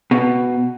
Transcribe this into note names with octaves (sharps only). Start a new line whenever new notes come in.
B2